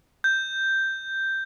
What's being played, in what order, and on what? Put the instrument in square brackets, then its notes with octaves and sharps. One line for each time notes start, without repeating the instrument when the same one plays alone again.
[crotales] G6